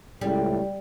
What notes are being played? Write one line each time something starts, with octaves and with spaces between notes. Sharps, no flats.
C#2 A2 G3